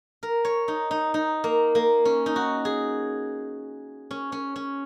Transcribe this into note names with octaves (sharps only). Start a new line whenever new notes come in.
A#4
C#5
D#4
D#4
D#4
A#3
A#3
C#4
D#4
F#4
G#4
C#4
C#4
C#4